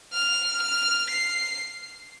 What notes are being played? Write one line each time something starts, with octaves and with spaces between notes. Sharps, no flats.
F6
F6
C7